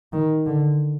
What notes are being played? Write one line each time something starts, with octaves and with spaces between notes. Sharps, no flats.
D#3
D3